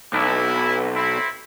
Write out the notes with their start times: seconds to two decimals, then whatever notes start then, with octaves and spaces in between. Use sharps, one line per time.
0.13 B1 E4
0.95 C4 E4